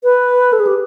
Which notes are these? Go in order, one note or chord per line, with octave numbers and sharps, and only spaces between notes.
B4
A4
G#4
G4